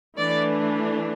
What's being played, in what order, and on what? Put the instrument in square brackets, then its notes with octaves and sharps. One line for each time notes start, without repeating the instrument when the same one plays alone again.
[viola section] E3 A3 D4 D5